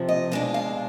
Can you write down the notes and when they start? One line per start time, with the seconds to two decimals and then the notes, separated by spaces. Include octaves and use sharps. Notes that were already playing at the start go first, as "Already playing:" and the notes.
Already playing: F2 C3 F3
0.09 D#5
0.32 B2 G#3 D4 F5
0.54 F5